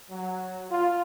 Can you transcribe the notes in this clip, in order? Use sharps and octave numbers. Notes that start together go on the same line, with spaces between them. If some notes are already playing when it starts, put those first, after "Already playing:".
F#3
F4